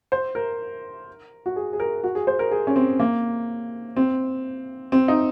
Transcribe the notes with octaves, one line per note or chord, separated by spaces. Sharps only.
C5
A#4
F#4
G#4
G#4
A#4
F#4
G#4
C5
A#4
G#4
C#4
C4
A#3
C4
C4
D#4